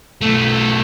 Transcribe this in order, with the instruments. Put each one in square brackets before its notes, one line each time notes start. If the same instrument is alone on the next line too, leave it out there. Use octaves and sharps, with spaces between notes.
[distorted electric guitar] B1 A3